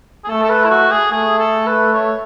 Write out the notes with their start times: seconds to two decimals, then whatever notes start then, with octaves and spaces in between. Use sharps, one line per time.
0.24 G#4
0.29 A3 A4
0.43 A4
0.50 B4
0.65 E4
0.70 F#4
0.91 G#4
1.11 A3 G#4
1.39 A4
1.66 B4
1.93 C#5